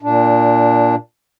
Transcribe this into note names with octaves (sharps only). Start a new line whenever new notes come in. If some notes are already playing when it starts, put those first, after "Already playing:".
A#2 D4